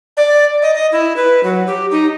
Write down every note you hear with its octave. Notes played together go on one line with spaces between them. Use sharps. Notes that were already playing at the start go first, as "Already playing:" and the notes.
D5
D#5
D#5
E4
B4
F#3
G4
D#4